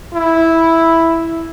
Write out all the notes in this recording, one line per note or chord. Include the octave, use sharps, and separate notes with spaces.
E4